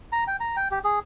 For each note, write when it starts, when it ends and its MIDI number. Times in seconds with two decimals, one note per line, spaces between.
0.12 0.24 82
0.27 0.36 79
0.40 0.56 82
0.56 0.68 79
0.71 0.79 67
0.84 0.99 68